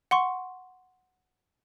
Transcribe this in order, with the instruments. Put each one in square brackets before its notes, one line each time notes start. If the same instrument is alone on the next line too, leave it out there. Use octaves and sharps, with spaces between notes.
[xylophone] F#5 C6 C#6